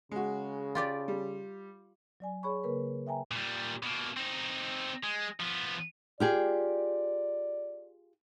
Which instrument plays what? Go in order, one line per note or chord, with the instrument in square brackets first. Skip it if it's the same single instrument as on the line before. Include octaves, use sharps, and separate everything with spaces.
[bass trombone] C#3 [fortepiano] G#3 F#4
[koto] F4 G4 D5
[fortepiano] G3
[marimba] F#3 D5 G#5
G#4 C#5 B5 C#6
C#3 A#3 A#4 B4
E5 G5 G#5 A#5
[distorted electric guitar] A#2 G3
B2 A#3
C4 D#4
G#3
F3 B3
[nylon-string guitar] F4 G4 G#4 [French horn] D5